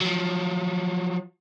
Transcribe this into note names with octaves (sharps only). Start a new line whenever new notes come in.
F3 F#3